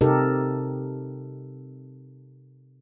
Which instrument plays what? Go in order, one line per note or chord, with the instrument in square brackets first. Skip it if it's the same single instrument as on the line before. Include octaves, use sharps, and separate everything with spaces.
[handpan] C3 D#4 G4 A4 A#4